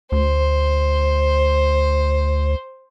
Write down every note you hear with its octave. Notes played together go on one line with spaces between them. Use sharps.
D2 C5